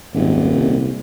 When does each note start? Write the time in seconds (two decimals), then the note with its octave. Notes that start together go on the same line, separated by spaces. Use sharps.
0.14 D#1 G#1
0.54 C2